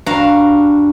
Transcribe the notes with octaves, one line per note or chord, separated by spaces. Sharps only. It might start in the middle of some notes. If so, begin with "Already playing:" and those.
G2 D4 F#4 F5 A#5